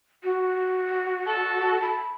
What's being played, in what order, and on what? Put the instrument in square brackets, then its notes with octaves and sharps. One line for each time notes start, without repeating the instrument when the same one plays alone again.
[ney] F#4
[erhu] A4
[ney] B5